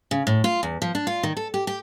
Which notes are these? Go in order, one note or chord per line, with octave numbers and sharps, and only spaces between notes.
C#3
A2
F4
E2
F3
D4
F4
D#3
A4
G4
G4